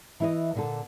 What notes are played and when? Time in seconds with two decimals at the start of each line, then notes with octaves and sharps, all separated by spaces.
0.20 E3 E4 D#5
0.55 A#2 D3 A4